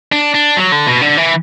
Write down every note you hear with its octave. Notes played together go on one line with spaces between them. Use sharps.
D4
D4
F#3
D3
B2
D3
E3